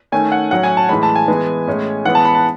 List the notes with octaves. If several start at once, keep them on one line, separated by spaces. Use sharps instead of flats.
D#3 A3 C#4 G#5
F#5
A2 F#3 C#4 F#5
G#5
A5
A2 E3 G#3 B5
A5
G#5
E3 G#3 B3
A2 G#3 C#4
E3 G#3 B3 F#5
A5
B5
A5